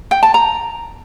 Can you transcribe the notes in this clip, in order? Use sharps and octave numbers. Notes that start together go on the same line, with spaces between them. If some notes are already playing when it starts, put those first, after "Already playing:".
G5
A5
A#5